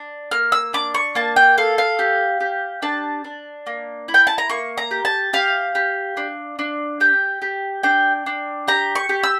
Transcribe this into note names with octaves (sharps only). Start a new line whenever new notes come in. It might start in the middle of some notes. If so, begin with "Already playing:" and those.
Already playing: D4
A#3 F6
E6
D4 D6
C#6
A#3 A5
G5
A4 F5
F5
G4
G4
D4 A5
D4
A#3
E4
G5
A5
A#5
A#3 C#6
A#5
G4
A5
G4 F5
G4
D4
D4
G4 G5
G4
D4 G5
D4
G4 A#5
C#6
G4
E6